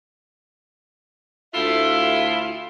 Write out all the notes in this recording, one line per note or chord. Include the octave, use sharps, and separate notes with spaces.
D2 E4 F4 A4 E5 F5